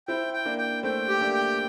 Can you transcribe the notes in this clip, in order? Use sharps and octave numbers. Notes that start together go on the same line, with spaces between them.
C4 E4 G5
G5
A#3 D4
G5
A3 C4 G5
G4
A#3 D4
G5